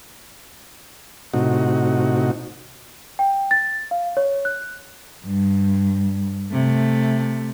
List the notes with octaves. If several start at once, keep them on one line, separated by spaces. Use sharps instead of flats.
A2 C3 D#4 F#4
G5
A6
F5
C#5
F#6
G2
C3 A3